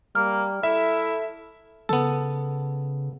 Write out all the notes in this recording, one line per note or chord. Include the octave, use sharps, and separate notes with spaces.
G3 A#3 F6
E4 A4 E5
C#3 B3 A4